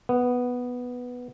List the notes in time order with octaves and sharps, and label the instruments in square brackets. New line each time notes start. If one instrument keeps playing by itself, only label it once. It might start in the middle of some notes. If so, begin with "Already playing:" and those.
[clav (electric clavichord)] B3